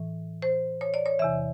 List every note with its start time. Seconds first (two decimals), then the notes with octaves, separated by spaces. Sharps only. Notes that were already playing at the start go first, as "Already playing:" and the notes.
Already playing: A2 E3
0.42 C5
0.81 C#5
0.94 D5
1.06 C#5
1.19 E2 C3 E3 E5